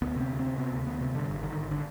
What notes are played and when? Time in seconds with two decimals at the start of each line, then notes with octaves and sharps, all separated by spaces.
0.02 D2 B3
0.16 C3 C4
0.30 D2
0.39 C3 C4
0.58 C3 B3
0.72 D2
0.86 D2 B3
1.01 C3
1.15 G2 D3
1.29 G#1
1.43 D3 D#3
1.57 G#1
1.71 D3